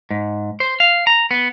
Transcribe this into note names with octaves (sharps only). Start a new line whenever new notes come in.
G#2
C5
F5
A#5
B3